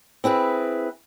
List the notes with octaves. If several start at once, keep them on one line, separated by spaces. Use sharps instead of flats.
C4 E4 G#4 B4